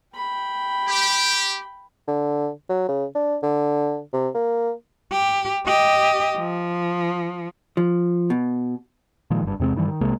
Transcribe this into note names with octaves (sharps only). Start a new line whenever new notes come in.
G5 B5
G4
D3
F#3
C#3
D4
D3
C3
A#3
G4
G4 D#5
F3
F3
B2
A#2 D#3 F3 G#3
F#1 G2
E2 C3 G#3 C4
G2 D#3 E3 G3
D#3
C2 C3 G#3 A#3